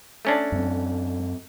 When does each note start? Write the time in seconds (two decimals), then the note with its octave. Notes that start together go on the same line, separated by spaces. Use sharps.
0.25 A3 C#4 D4
0.52 F#2 C4